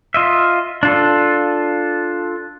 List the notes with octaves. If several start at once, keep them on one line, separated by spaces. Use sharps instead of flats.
F4 D#5 E5
D4 F4 A4